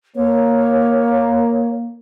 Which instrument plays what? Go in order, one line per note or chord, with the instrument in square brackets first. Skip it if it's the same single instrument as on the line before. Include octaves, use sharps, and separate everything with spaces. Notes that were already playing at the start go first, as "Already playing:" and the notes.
[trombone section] A#3 [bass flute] C#5